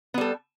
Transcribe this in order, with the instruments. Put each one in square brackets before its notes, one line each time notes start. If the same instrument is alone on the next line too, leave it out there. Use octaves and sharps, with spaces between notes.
[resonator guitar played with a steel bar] B3
G3
A4